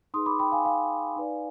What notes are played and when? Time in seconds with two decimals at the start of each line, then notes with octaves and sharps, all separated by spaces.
0.14 D#4 G#4 B4 C6 D#6
0.26 B5 D6
0.39 G5 B5
0.52 F5 G#5
0.65 F5 G#5
1.16 D#4 B4 D5